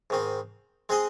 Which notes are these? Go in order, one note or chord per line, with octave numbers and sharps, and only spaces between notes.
G#2 D#3 C4
G#3 C4 G#4 D#5